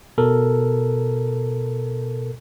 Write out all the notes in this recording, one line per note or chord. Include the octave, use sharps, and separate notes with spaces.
B2 A4 A#4